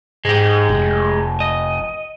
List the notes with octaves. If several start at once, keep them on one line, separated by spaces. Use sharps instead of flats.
G#2 G#3 G4
F1
D#5